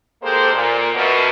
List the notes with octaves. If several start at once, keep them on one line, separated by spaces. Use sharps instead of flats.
G#2 G#3 A#3 G4 A4 C5
A#2
F#2 B2